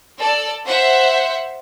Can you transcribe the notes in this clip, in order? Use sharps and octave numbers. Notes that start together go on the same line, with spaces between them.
A4 D5
C5 E5 F#5